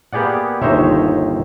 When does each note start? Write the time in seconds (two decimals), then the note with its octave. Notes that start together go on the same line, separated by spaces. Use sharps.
0.13 A#3 B3 G4 G#4 D5 F#5
0.62 G1 D#2 D#4 C5 C#5 E5